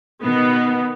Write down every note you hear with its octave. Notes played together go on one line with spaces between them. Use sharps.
B2 D#3 B3